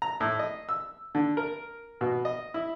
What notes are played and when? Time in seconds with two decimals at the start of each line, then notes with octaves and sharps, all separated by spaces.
0.02 A#5
0.20 A2
0.39 D#5
0.69 E6
1.15 D3
1.37 A#4
2.01 B2
2.25 D#5
2.54 E4